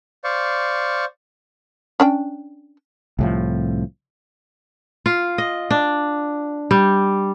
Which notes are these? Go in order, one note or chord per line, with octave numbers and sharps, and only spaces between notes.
C5 D5 F5 C#6
C#4 D4 G5
C2 A2 F3
F4
D#5
D4
G3